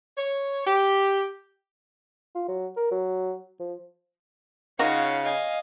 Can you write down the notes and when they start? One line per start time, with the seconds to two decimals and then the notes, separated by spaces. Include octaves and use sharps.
0.18 C#5
0.67 G4
2.35 F4
2.48 F#3
2.77 A#4
2.91 F#3
3.60 F3
4.79 C#3 D#4 F4 F#4 C#5 F5
5.23 D#5 F5 G#5